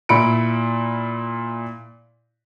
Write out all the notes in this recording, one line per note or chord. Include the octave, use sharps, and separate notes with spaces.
A#2 E4 B5 C#7 D7